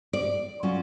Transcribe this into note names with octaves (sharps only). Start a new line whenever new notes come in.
D5
F#3 C#4 F4